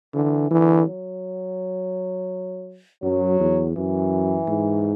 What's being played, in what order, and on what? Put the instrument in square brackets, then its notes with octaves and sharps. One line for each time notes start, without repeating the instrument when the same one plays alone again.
[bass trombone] D3 [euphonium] E3
[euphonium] D3 [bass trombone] E3
[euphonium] F#3
[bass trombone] F#2 [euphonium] F#3
[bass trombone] E2
[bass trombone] F#2 [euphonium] E3
[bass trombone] G#2